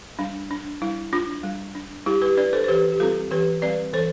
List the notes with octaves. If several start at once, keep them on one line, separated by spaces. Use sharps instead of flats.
G3 D4
D4
G3 E4
D4 F4
G3
D4
G3 E4 G4
G4 B4
D4 B4 D5
A4 C5
C5
E3 G4 B4
G4
G3 C4 F4 A4
E3 G4 B4
G3 C4 B4 D5
E3 A4 C5